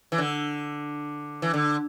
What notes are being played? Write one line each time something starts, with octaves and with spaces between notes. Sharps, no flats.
E3
D3
E3
D3